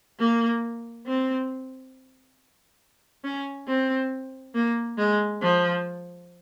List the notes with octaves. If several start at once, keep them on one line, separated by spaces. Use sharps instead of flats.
A#3
C4
C#4
C4
A#3
G#3
F3